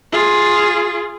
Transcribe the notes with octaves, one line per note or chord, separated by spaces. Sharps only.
F4 G#4